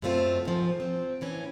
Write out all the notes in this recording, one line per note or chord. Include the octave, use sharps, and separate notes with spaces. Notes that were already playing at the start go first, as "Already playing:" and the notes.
F#2 B2 A3 C4 F4
G#2 F3
C4
A2 E3 C#4